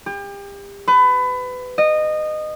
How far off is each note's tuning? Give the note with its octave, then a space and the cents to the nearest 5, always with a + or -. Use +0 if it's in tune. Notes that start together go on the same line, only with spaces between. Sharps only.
G4 +35
B4 +25
D#5 -20